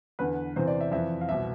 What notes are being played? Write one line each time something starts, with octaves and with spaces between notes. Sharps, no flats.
E2 D3 B4
E2 C3 E3 C5
D5
E5
F2 E3 E5
F5
C2 B2 E5